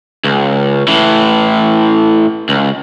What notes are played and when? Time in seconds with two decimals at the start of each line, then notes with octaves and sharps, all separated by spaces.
0.24 C#2
0.88 A2 E3
2.49 C#2